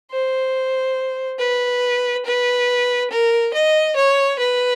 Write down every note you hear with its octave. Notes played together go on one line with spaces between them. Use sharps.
C5
B4
B4
A#4
D#5
C#5
B4